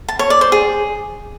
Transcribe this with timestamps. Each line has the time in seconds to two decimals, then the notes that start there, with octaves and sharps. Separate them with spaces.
0.08 A5
0.19 C#5
0.30 D5
0.41 C5
0.52 G#4